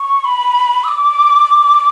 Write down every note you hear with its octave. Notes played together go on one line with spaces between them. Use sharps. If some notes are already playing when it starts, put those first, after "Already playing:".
Already playing: C#6
B5
E6
D6